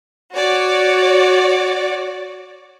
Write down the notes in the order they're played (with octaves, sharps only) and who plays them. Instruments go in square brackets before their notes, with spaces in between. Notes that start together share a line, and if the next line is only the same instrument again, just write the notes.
[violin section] F#4 C#5 D5